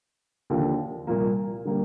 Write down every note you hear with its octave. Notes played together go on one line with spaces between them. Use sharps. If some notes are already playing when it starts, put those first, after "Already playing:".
D#2 D3 F3
C2 A#2 F3 A#3
D3 G3 A#3